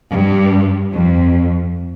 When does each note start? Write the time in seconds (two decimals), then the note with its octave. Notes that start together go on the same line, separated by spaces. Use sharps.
0.11 G2
0.93 F2